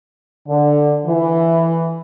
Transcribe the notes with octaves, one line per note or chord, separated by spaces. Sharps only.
D3
E3